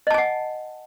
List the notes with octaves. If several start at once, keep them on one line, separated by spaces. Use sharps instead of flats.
D#5 F#5 G#5 A5